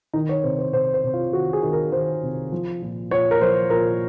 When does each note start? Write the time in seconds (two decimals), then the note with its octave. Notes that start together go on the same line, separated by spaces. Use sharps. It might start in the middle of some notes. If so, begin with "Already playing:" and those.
0.13 D#3 D#4
0.29 C#5
0.44 C3 C5
0.59 C5
0.73 C3 C5
0.94 C5
1.04 C3
1.14 F4
1.33 D#3 F#4
1.53 G#4
1.62 D#3
1.73 A#4
1.92 D#3 C5
2.22 C3
2.52 F3
2.82 A#2
3.11 A#2 C#5
3.31 A#4
3.41 F3 C5
3.70 A#2 A#4